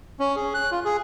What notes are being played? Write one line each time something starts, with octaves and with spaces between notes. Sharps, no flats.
C#4
G#4
F#6
F4
G#4